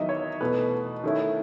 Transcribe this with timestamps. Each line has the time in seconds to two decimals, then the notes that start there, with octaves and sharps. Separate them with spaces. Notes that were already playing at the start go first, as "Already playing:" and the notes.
Already playing: E2 D#3 F#3 D#5 E5
0.09 C#5
0.41 E2 B2 A3 B4
1.04 D#3 A3 C#4 E4